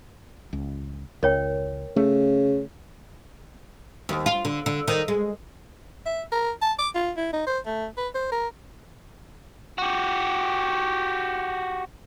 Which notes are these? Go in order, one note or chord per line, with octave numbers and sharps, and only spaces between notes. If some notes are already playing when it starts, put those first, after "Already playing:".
C#2
C#2 A#4 C#5 G5
C#3 A3
D#2
F4
D3
D3
D#3
G#3
E5
A#4
A5
D6
F4
E4
D#4
C5
A3
B4
C5
A#4
F#4 G4